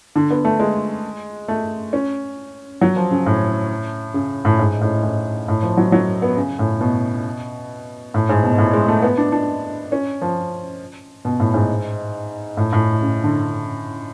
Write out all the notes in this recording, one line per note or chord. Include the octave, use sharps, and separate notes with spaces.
D3
B3
A3
G#3
A3
C#4
F#3
F3
C#3
A2
C#3
A2
G#2
A2
A2
A2
F3
F#3
F#3
B3
C#3
A2
B2
A2
G#2
B2
A2
G#3
A3
B3
D4
D4
C#4
F3
B2
A2
G#2
A2
A2
C#3
D3